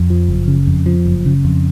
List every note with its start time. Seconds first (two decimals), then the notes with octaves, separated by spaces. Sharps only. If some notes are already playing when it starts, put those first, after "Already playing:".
Already playing: F2
0.10 F3
0.28 F#1
0.48 C#3
0.67 F2
0.86 F3
1.05 F#1
1.26 C#3
1.45 F2